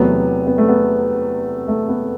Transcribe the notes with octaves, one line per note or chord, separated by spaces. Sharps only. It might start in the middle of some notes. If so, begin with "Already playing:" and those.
Already playing: E2 C3 F#3 A3 B3
B3
A3
B3
A3
B3